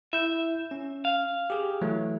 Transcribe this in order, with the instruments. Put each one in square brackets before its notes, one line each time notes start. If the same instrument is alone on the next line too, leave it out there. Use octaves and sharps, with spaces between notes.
[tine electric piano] E4 G6 [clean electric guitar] E5
[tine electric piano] C#4
[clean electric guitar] F5
[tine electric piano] G4 G#4
E3 F#3 A3